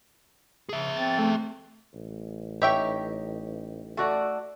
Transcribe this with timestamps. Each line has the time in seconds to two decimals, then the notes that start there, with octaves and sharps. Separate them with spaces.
0.69 C#3 G#4 E5
0.97 C4 A6
1.18 A3
1.95 A1
2.62 D#4 G4 C#5 E5 G5
3.97 A3 F#4 D5